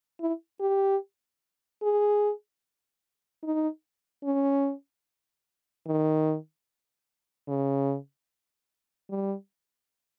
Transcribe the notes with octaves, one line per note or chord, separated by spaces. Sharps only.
E4
G4
G#4
D#4
C#4
D#3
C#3
G3